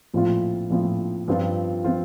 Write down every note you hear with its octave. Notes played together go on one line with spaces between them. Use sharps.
A#1 A2 F3 C4 F4
A#1 A2 F3 C4 F4
G2 F3 C4 F4
F3 C4 F4